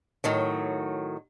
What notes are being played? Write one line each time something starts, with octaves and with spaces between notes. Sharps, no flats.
A2 D#3 F#3